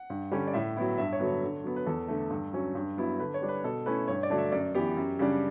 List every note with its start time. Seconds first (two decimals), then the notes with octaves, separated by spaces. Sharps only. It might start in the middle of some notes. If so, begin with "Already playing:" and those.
Already playing: F#5
0.10 G2
0.31 D3 G3 C#4
0.48 D5
0.54 A2 E5
0.77 F#3 B3 E4
0.98 G2 E5
1.13 C#5
1.20 D3 F#3 B3
1.27 C#5
1.43 D3
1.64 F#3 B3
1.76 B4
1.86 E2 A4
2.08 D3 A3
2.30 G2
2.53 F#3 C#4
2.75 G2
2.98 F#3 B3 E4
3.19 D3 B4
3.34 C#5
3.42 G3 D4
3.49 B4
3.64 B2 A4
3.86 A3 C#4 E4 B4
4.08 G2 C#5
4.23 D5
4.30 D3 F#3 A3 D4
4.38 E5
4.52 F#2 D5
4.75 E3 B3 G4
4.97 F#2
5.19 C#3 G3 D4